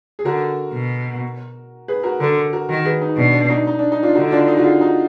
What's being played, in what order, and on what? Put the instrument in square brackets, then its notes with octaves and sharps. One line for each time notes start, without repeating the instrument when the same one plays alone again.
[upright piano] G#4
[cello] D3 [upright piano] F#4 A#4
[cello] B2
[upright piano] G#4 B4
F#4 A#4
[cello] D3 [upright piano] F#4 A#4
[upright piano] F#4 A#4
[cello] D#3 [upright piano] F#4 A#4
[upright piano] G#4 B4
D#4
[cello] B2 [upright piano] D4
[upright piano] D4
D4
D#4
D#4
D4
D#4
D4 F4
[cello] D3 [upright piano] D#4 F#4
[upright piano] D4 F4
D#4
F#4
F4 G#4
D#4 F#4